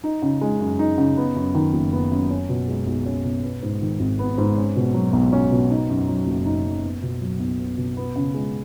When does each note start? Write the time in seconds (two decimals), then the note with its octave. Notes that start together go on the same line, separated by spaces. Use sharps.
0.04 D#4
0.22 C#3
0.41 G#3
0.60 F#2
0.79 D#4
0.98 C#3
1.17 B3
1.36 F#2
1.55 D#3
1.73 F#1
1.92 B3
2.11 F#2
2.30 C#4
2.49 B2
2.68 G#3
2.87 B1
3.06 C#4
3.24 B2
3.43 B3
3.63 G#2
3.81 D#3
4.00 G#1
4.19 B3
4.38 G#2
4.57 C#4
4.76 B2
4.94 F#3
5.13 B1
5.33 C#4
5.51 B2
5.70 D#4
5.89 F#2
6.08 F#3
6.27 F#1
6.46 D#4
6.65 F#2
6.83 B3
7.02 B2
7.21 F#3
7.40 B1
7.59 B3
7.78 B2
7.97 B3
8.16 C#3
8.34 G#3